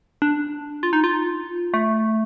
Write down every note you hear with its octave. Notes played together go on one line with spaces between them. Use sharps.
D4
F4
D#4
F4
A3